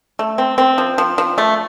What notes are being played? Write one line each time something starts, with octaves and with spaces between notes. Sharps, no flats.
A3
C4
C4
F3
F3
F3
A3